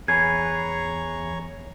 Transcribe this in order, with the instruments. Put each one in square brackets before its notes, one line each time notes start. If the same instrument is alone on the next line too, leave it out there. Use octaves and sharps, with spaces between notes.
[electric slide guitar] E2 G#4 B4 [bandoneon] C#5 A#5 C#6 [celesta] G#6